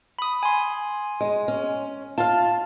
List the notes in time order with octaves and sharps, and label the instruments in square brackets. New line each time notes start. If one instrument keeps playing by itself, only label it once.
[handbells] B5 D#6
G#5 C6
[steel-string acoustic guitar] G#3
C#4
[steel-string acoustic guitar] F4 F5 [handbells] A5